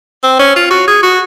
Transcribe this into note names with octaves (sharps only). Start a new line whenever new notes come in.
C4
C#4
F4
F#4
G#4
F#4